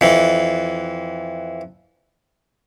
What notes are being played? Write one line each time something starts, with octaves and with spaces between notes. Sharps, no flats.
F2 E3